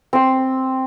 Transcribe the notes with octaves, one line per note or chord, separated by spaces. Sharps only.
C4 C6